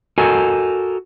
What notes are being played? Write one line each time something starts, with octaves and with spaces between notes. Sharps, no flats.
F#4 A4 A#4 D#5 G#5